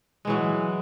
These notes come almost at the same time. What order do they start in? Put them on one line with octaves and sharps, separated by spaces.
G#3 E3 F#3